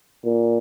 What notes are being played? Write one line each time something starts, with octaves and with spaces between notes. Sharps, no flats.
A#2